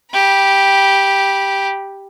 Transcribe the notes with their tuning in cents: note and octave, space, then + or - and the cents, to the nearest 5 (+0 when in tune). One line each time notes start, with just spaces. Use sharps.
G4 +0 B5 -20